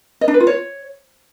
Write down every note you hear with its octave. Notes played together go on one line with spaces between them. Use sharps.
D#5
D4
B4
F4
C#5